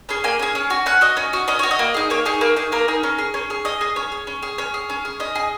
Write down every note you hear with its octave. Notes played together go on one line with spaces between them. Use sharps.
C#4 G#4
A#3 G#5
C#4 G#4
C#4
F#4
C#4 F#5
F#4 D#5
C#4
F#4
C#4 D#5
F#4 C#5
D#5
A#3
D#4 G#4
A#3 C#5
D#4 G#4
A#3
D#4 G#4
A#3 A#4
D#4 G#4
C#4
G#4
C#4 C#5
G#4
C#4 D#5
G#4
C#4 C#5
G#4
C#4
G#4
C#4 C#5
G#4
C#4
G#4
C#4 D#5
G#4